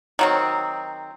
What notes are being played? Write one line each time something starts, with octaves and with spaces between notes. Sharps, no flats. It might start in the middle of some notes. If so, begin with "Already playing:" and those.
D#3 F#3 C4